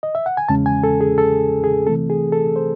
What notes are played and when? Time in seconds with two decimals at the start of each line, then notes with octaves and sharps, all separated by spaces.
0.03 D#5
0.15 E5
0.26 F#5
0.37 G#5
0.49 E2 C#3 G#3 C#4 A5
0.66 G#5
0.83 A4
1.01 G#4
1.18 A4
1.64 G#4
1.87 C3 E3 A3 C4 A4
2.10 G#4
2.32 A4
2.56 C5